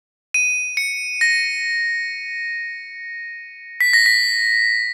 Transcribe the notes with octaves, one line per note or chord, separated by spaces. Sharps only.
D#7
C#7
A#6
B6
A#6
B6